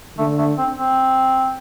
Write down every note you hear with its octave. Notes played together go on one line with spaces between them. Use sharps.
D3 A3
A3
C4
C4